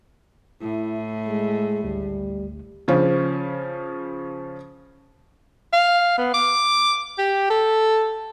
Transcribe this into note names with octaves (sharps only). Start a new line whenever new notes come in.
A2 E4
G#3
G#1 D2 G3
C#3 F3 C#4
F5
B3
D6
G4
A4